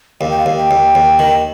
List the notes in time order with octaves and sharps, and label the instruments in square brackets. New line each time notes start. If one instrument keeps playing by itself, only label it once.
[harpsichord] D#2 [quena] F5
[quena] G5
F5
[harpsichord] D#2
[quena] G5
[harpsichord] D#2
D#2
D#3